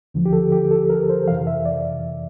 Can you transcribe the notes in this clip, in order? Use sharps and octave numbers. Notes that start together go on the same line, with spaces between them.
D2 D3 F3
G4
A4
G4
A4
A#4
C5
F2 C3 E3 F5
E5
D5